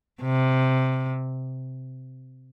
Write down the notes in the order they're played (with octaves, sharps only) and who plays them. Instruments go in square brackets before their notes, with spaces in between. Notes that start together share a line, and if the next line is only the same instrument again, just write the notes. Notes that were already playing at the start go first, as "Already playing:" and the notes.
[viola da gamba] C3